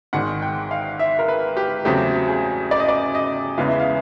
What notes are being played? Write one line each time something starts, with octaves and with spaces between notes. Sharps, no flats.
G#1 G#2 D#3 G#3 F#5
G5
F5
E5
A#4
B4
G4
E2 C#3 F#3 A3 C4 G4
G#4
D5
D#5
D5
D#5
E2 C#3 E3 G#3 B3 F5
E5
F5